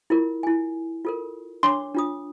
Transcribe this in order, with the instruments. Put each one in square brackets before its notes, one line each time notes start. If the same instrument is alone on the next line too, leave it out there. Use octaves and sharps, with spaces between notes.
[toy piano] E4 F4 A#4
E4 G#5
F4 A4 A#4
[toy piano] D4 C#5 D6 [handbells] C6
[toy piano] D4 F4 D#6